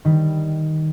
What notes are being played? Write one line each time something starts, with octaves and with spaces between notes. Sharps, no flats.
D#3 G3